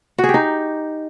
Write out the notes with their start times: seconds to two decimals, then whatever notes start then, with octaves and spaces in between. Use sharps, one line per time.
0.18 F#4
0.24 G#4
0.29 G4
0.34 D#4